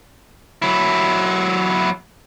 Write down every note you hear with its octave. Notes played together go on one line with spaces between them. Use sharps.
F#3 E4